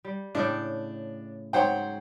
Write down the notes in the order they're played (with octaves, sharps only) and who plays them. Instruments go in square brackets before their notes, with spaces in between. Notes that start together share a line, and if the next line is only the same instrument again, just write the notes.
[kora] G3
[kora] A2 C#3 G5 [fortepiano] D4
[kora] G#2 F#3 C#5 [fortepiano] C5 F#5 G5